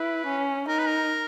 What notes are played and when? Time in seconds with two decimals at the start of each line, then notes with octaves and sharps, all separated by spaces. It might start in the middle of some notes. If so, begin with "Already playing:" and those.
Already playing: E4 B4
0.26 C#4
0.68 D#4 A#4
0.78 B4
0.87 A#4